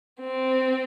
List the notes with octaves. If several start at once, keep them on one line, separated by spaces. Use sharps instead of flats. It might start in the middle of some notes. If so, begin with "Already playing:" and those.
C4